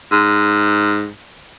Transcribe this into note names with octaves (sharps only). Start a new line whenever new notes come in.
G#2